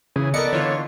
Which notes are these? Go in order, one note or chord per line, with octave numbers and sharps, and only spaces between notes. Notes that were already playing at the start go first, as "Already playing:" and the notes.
C#3 E3 G#4
B3 A4 A#4 D5 D#5 C#7
D3 E3 F4 C#5